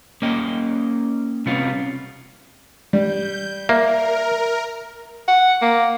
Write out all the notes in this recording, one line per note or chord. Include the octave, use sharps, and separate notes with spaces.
A#3 C#4 D#5 G5
C3 G3 B3 C#4 F4
G3 G6
A#3 A#4 E5
F#5
A#3